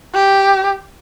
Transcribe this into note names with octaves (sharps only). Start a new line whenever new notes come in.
G4